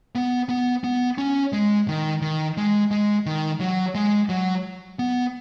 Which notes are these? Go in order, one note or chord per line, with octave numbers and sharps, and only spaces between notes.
B3
B3
B3
C#4
G#3
D#3
D#3
G#3
G#3
D#3
F#3
G#3
F#3
B3